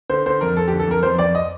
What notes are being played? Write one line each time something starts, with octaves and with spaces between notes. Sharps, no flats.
D3 C5
D3 C5
F2 A#4
F2 A4
G4
D3
A4
F2 A#4
F2 C5
F2 D5
D#5